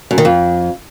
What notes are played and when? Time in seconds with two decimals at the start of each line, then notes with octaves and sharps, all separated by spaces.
0.11 F#2
0.18 D#3
0.25 F2